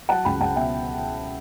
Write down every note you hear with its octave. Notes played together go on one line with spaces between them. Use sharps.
F#3 F#5 A5
C#2 G5 B5
C#2 F#5 A5
B2 E5 G5